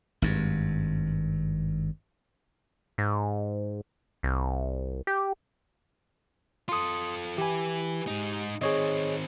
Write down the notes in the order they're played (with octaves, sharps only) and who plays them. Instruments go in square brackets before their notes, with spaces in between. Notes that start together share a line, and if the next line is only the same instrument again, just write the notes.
[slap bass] G#1 G2
[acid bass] G#2
C2
G4
[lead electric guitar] F4 A4 [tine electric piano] C6 D#6
[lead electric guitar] E3 B4 [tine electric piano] G4 G#5
[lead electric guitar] G#2 D#4
[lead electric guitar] D#3 C4 [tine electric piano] G#4 C#5 D#5